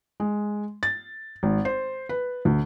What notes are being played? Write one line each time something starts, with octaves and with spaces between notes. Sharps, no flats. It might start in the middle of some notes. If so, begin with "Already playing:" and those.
G#3
A6
G#1
C5
B4
D2